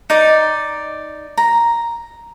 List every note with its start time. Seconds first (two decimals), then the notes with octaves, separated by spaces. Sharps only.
0.10 D#4 D5
1.38 A#5